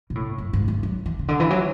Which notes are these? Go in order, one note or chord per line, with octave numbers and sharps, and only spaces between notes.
B2
A2
F#2
G#2
D3
F#3
E3
C#3
D3
E3
F#3